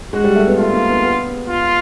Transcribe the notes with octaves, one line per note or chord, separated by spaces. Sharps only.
G#3 F#4
G3
A3
B3
A3 F4
A#3
B3
B3
F4